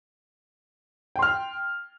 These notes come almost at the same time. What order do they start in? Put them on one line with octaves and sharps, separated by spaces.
G5 C6 F6